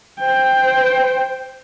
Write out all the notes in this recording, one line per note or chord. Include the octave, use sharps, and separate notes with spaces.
C5 G5